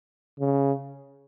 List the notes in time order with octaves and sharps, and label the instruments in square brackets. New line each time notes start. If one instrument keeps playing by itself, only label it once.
[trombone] C#3